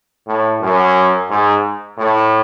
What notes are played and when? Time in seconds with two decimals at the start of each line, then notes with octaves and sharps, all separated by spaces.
0.27 A2
0.61 F#2
1.30 G#2
1.98 A2